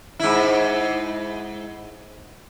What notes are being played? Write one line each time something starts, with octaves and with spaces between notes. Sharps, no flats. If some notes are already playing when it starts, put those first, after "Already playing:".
G#2 E4